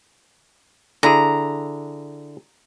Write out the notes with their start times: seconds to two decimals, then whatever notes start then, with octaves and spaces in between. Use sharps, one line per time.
1.03 D3 E4 G#4 A#5